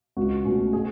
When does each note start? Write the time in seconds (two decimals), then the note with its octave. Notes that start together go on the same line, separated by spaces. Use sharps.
0.16 C#2 F#4
0.45 B2 A3 C#4
0.73 G#4